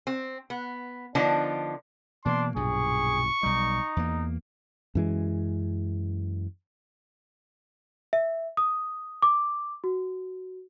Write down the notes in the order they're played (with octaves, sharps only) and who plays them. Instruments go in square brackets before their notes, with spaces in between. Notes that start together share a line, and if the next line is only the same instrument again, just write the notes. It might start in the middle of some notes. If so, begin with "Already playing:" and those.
[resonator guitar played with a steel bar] C4
B3
D3 F3 B3 D4 D#4
[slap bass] B2 E3 A#3 [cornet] D4 [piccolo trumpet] C6
[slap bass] B1 G2 A#2 [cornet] G#4 [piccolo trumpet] C#6
[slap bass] B1 G3 [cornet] D#4
[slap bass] E2 A#3
[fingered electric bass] F#2 E3 G#3
[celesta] E5
D#6
D6
F#4